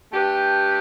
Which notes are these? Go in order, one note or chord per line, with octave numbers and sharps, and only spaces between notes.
A3 D4 G4 B4